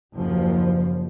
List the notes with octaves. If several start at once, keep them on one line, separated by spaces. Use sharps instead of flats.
F#1 D#2 F3